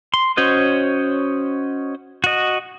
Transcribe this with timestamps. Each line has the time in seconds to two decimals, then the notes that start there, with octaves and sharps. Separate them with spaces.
0.14 C6
0.37 C#4 F#4 C5 C#5 D#5
2.24 F#4 D#5